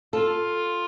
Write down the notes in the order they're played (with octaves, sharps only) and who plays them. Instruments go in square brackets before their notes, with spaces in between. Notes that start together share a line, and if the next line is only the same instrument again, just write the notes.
[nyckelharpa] F4 [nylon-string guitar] A4